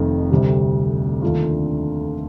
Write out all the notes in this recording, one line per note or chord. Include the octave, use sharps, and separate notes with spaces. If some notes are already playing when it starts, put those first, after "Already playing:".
Already playing: F1 F2 D#3 A3
D2 C3 G3
D#2 D3 A3 D4 F4